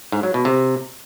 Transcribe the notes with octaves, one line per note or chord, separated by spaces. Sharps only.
G#2
F#3
B2
C3